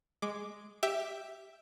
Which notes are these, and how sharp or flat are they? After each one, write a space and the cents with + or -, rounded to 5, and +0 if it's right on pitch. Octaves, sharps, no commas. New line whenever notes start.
G#3 +0 D6 +5
G4 +0 E5 +0